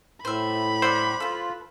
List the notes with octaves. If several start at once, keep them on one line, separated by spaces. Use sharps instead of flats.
A2 C5 E5 B5
C5 D5 E5 F#5
F4 A4 B4